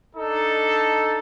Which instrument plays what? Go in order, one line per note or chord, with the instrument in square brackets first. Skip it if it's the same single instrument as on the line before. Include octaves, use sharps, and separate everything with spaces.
[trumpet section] D4 D#4 A4